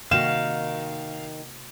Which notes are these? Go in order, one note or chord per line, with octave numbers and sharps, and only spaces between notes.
C3 D#3 A#3 F#4 F5 E7